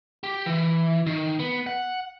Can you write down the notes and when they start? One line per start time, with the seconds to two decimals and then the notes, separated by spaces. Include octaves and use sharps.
0.24 G4
0.46 E3
1.07 D#3
1.39 B3
1.67 F#5